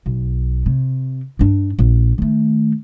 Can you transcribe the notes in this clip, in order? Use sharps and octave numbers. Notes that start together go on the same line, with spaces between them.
B1
C3
G2 D4
A#1
D#3 A3